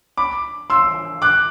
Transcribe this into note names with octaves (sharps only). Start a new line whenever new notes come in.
B5 D6
C6 E6
D6 F#6